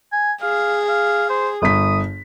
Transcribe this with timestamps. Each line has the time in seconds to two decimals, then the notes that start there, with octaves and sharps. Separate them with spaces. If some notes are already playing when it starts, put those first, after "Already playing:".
0.12 G#5
0.42 G#4 F5
0.89 F5
1.29 C5
1.62 G1 D#6 B6